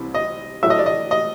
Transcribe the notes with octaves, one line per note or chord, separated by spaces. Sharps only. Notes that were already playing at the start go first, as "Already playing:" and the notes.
Already playing: C2 C3 E3
D#5
A2 F#3 E5
D#5
D5
D#5
D#5